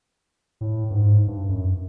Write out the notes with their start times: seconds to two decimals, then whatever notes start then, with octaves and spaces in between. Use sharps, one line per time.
0.61 A2
0.90 G2
0.94 G#2
1.27 G2
1.49 F#2